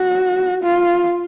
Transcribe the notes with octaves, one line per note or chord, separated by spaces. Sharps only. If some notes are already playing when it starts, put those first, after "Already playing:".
Already playing: F#4
F4